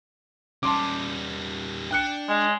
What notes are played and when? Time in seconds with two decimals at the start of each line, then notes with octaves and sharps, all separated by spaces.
0.63 G3 C#4 A5 C6 D6
1.91 D4 G5 F#6 C#7
2.29 G#3